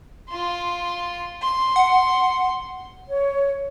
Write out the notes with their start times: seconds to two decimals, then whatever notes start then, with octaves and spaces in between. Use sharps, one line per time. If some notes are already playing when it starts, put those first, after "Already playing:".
0.29 F4 C6
1.42 C6
1.76 F#5
3.08 C#5